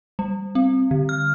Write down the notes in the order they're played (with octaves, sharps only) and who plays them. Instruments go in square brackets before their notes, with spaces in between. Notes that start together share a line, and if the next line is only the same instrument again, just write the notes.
[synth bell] G3
C4
D3
F6